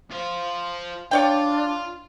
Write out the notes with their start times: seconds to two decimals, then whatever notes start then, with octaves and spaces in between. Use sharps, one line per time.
0.11 F4 C5
1.11 D4 F4 C#5 D5 G5